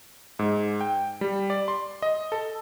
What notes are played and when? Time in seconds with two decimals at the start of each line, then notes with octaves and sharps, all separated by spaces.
0.39 G#2
0.81 G5
1.21 G3
1.50 D5
1.68 C6
2.02 D#5
2.32 A4